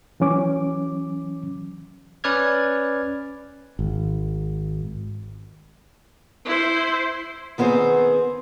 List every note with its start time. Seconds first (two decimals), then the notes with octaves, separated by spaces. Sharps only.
0.20 E3 F#3 C#4 D6
2.24 C#4 B4 D5 F6 G#6
3.79 G#1
6.45 E4 C5
7.58 D#3 B3 C4 G#4 C5